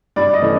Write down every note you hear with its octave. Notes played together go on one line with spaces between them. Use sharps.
G2 D5
D#5
E3 A3 C#4